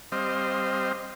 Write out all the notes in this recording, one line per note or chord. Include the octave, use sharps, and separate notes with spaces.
G3 C4 C5 D#5 F5